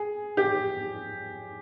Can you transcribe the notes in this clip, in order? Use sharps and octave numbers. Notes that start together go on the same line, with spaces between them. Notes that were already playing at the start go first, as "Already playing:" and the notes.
Already playing: G#4
G4